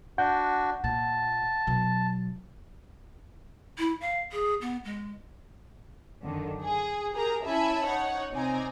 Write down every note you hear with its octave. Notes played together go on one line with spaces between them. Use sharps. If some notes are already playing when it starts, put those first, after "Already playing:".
D4 F#4 F#5 G6
A#2 A5
B2 F#3
E4
F5
G#4
B3
G#3
F#2 D3 D#3
G#4
G4 G#4 A#4 A#5
C#4 E4 E5 G#5 A5 B5
D#4 C#5 F#5
C3 C4 D#4 D5 G#5 A#5